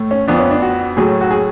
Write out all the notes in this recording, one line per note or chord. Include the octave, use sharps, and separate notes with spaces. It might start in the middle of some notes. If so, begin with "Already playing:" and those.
Already playing: A2 A3
C#4
F2 F3 B3 D4
C#4
D4
F#4
A2 F#3 A3 G#4
F#4
G#4